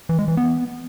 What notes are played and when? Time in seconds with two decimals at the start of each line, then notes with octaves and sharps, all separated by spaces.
0.09 E3
0.19 G#3
0.28 E3
0.37 B3